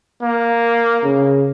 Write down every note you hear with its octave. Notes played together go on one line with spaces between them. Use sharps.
A#3
C#3